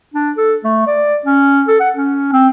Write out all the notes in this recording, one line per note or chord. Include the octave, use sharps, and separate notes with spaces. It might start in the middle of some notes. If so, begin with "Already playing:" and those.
D4
A4
A3
D5
C#4
A4
F#5
C#4
C4